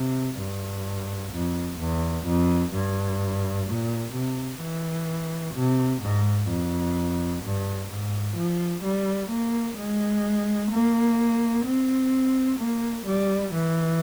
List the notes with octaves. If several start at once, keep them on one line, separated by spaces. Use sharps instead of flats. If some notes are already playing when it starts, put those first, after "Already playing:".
Already playing: C3
G2
F2
E2
F2
G2
A#2
C3
E3
C3
G#2
F2
G2
G#2
F3
G3
A#3
G#3
A#3
C4
A#3
G3
E3